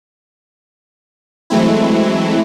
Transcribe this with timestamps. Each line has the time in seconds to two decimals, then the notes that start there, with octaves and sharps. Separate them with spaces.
1.50 E3 F#3 G#3 A3 C4 E4